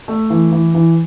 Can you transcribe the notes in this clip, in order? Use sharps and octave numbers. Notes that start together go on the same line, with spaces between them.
A3
E3
E3
E3